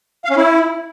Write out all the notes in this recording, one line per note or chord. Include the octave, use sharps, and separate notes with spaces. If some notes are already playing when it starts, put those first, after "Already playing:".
F5
C#4
E4